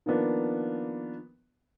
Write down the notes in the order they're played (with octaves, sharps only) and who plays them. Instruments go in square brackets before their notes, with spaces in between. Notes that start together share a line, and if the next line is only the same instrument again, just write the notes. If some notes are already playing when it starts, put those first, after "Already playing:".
[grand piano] D#3 F3 A#3 B3 D4